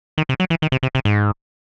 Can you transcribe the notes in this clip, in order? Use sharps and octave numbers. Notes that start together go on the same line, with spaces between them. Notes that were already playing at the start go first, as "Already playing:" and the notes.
D#3
C3
F#3
E3
D#3
C3
C3
C3
G#2